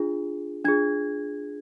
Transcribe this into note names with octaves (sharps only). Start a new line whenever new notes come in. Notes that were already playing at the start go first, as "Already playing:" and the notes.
Already playing: D4 F4 G#4
D4 F4 G#4 G#6